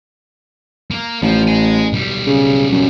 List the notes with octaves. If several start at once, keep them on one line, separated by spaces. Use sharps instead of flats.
A#3 A#4
A1 F3
D#5 G#5
B1 G3
C#3
F#2